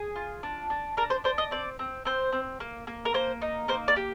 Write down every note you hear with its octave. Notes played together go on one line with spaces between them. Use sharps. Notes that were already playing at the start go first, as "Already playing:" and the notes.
Already playing: G#4
F4
D4
D4
D4 A#4
C5
D4 C5
D#5
C4 D5
C4
C4 C5
C4
A#3
A#3
A#4
A#3 C5
D#4
A#3 C5
D5
G4